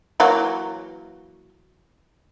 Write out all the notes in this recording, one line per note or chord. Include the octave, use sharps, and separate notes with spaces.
E3 F#3 A#3